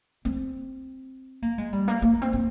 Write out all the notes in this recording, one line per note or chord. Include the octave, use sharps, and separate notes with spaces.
C4
A#3
G#3
G3
A#3
A#3
C4
C4